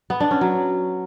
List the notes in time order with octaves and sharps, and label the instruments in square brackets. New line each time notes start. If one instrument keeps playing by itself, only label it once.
[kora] B3
D4
C#4
F#3